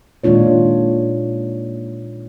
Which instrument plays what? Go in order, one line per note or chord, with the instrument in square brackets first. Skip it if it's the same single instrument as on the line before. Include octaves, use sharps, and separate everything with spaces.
[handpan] A#2 D#3 G#3 D4 F4 C#5